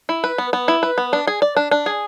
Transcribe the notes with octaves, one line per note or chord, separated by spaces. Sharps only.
E4
B4
B3
B3
E4
B4
B3
D4
G#4
D5
D4
D4
G#4